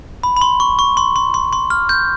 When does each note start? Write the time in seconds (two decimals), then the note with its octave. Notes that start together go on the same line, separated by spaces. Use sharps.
0.23 B5
0.36 B5
0.41 C6
0.60 C#6
0.79 C#6
0.97 C6
1.16 C6
1.34 C6
1.53 C6
1.70 F6
1.89 G6